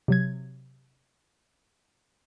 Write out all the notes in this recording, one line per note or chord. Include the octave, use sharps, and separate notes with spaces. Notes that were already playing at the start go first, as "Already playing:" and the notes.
C3 F#3 G#6